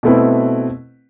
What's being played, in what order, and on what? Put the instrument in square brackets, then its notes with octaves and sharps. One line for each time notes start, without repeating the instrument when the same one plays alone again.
[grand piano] B2 A3 C4 E4 B4